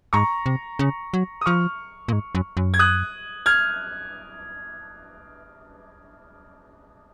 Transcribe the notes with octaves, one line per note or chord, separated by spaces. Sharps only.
G#2 A#5 C#6
C3
C#3
F#3
D#6
F3 C#6 F6
A#2
G#2
F#2
F#2
G#6
D#6 F#6
F6 G#6